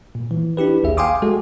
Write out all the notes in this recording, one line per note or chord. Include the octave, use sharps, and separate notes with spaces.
A#2
E3
D4 E4 G4 B4
A1 D#2 G#4 E5
F5 G5 G#5 C6 D6 D#6
G#3 F#4 A4